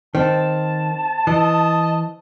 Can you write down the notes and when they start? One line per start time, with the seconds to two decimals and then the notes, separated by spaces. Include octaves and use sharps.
0.15 D#3 C4 A5
1.27 E3 D#5